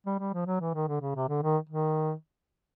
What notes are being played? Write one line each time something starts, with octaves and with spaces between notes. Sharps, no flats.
G3
G3
F3
F#3
E3
D#3
D3
C#3
C3
D3
D#3
D#3